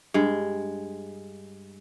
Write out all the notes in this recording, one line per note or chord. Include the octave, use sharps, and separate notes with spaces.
G2 G#3